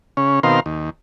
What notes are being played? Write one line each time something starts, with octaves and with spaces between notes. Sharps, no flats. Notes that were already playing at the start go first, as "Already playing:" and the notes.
C#3 C#4
B2 D#3 C4 A#4 F5 C6
D#2